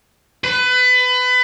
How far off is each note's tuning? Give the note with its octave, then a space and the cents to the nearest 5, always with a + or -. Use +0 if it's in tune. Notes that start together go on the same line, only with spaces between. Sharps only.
B4 +25